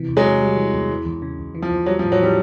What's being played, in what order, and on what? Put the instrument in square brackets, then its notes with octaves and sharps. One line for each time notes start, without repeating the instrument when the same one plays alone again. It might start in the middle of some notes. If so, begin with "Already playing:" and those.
Already playing: [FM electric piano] C3 E3
E2
[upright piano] F#3 G#3
[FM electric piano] C3
G3
E3
E2
E3
E2
C#3
E2
E3
[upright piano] F3
[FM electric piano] E2
[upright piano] F#3 [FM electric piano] G3
[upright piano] F3
[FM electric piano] A2
[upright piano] F#3
[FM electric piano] E3 [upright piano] F3 G3